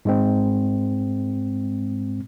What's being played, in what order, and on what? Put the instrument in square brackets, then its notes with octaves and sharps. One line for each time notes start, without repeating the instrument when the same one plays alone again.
[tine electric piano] G#2 G#3 C4